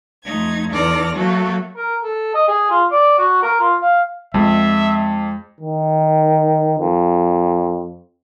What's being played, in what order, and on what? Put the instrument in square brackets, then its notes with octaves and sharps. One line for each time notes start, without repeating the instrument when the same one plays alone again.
[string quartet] F2 A3 D#4 G#6
E2 D#4 A4 D5 F6 A#6
F#3 A3 A#3 F#4 A4
[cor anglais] A#4
A4
D#5
G#4
F4
D5
F#4
A#4
F4
F5
[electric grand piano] F2 [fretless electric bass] G#3 [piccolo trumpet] E5
[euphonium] D#3
F2